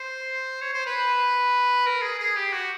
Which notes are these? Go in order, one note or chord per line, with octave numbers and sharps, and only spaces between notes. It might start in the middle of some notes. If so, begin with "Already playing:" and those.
Already playing: C5
C#5
C5
B4
A#4
G#4
G#4
G4
F#4